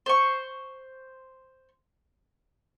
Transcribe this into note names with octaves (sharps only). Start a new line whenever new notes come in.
C5 C#6